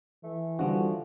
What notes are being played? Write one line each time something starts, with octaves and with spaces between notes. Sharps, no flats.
E3 A3
D3 F3 G3 F#4